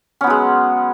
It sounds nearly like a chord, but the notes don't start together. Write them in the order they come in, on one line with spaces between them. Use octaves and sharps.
C#4 B3 F#3 G#3